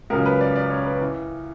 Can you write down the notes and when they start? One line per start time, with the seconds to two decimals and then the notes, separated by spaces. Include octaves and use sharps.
0.10 C#2 C#3 F#3 A#4
0.26 B4
0.41 D5
0.56 D5
0.70 C#5
0.86 B4
1.01 E3